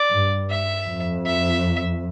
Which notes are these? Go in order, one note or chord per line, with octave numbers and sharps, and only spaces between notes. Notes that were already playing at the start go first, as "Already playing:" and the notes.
Already playing: D5
G2
E5
F2
E5